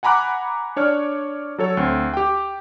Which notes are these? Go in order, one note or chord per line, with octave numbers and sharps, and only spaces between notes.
F#5 G#5 A#5 B5 D6 F#6
D4 C#5 D5 F6
F#3 A4 C#5
D2 C4
G4 G5